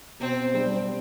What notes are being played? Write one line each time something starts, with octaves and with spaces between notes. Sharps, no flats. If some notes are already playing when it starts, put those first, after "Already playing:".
B2 C4
G3 C4 D4 G4